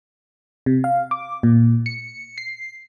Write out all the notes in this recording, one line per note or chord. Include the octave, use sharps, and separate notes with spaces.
C3
F5
D6
A#2
C#7
C7